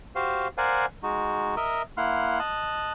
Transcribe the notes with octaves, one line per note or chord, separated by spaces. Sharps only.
F#4 G4 C5 F5
A#4 C5 D5 F5 F#5 G#5
G#3 D#4 F#4
A#4 D#5 E5
A#3 E4 F#5 C6 F6
D#5 A5 F#6